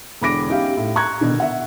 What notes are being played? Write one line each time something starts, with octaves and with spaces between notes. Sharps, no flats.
E1 D3 B5 D6 A#6 D7
C#4 D#4 G4 E5 F5
A2
A#5 C#6 F#6 G#6
B2 D3 D#3
E5 F#5